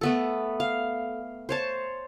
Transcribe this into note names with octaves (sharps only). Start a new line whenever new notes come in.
A3 B3 A4
F5
C5 C#5 A5